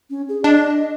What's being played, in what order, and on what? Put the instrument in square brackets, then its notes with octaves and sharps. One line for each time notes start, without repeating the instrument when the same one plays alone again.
[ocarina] C#4
G#4
[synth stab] D4 [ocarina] D#5